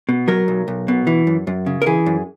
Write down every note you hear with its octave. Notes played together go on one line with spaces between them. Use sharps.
B2
F#3 A#4
B1
B1
B2
E3
F#2
F#2
C#3
A#4
E3 G#4
F#2